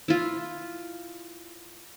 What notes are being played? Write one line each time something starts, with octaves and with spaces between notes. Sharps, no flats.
E4 F4